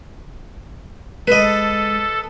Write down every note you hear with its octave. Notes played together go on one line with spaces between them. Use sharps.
G#3 A4 B4 D#5